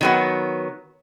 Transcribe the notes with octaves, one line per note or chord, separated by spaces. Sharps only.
D#3 F#3 B3